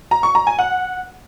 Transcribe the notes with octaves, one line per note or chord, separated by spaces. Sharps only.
A#5
C#6
A#5
G#5
F#5